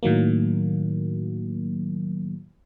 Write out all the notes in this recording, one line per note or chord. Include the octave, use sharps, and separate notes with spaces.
A2 D#3 F#3 A#3